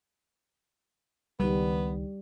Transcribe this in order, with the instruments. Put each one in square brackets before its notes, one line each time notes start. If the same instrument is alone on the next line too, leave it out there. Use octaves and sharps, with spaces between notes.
[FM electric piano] C#2 D#3 [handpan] G3 [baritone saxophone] B3